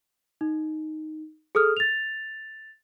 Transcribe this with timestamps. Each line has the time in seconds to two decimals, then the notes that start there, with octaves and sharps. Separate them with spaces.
0.41 D#4
1.55 G#4 A4 D#6 F6
1.77 A6 F7